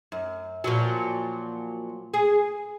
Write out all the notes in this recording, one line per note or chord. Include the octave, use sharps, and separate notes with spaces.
F#2
A#2 F3 F#3
G#4